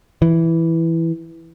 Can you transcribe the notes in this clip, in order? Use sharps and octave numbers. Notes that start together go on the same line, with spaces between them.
E3